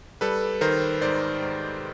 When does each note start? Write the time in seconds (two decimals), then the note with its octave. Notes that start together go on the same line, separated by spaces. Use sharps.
0.21 G3 A4 B4
0.61 D#3 A#4 C5
1.02 G#2 C5 D5
1.42 G#2